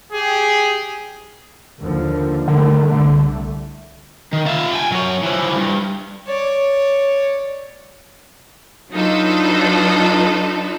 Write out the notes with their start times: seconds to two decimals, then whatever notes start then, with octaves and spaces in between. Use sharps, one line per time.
0.13 G4 G#4
1.81 D#2 D3 F3
2.48 D3 D#3 G3 A3
2.91 C2 A3
4.33 D#3
4.46 F4 E5
4.73 G5 G#5
4.92 F#3 C#4
5.23 E3 F3
5.56 G2
6.26 C#5 D5
8.92 F#3 D4 D#4 F4 A4 B4